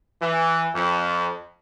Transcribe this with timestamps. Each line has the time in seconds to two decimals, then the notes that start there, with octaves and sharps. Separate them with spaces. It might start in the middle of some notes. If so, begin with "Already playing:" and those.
0.22 E3
0.76 F2